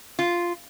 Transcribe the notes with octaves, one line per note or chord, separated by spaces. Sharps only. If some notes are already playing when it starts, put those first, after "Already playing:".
F4